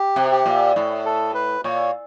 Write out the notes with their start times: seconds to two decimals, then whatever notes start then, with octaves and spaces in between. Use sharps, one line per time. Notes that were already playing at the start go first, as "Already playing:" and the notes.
Already playing: G4
0.16 C3
0.32 G4
0.46 A#2
0.76 A2
1.05 A4
1.35 B4
1.64 A#2 C#5